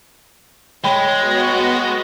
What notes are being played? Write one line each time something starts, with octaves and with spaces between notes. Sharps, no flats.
G#3 C#5 G5 B5
B3 F#4